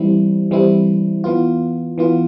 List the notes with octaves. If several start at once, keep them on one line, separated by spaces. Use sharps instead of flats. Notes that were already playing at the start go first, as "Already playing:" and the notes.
Already playing: E3 G3 C4 E4
E3 G3 C4 E4
E3 B3 F4
E3 B3 F4